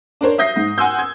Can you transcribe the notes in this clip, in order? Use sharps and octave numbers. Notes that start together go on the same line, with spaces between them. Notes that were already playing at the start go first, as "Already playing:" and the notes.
D4 A#4 C5 C#5
E5 D#6 G6 A#6 C7
G#2
F#5 G#5 C6 E6 G6
G#6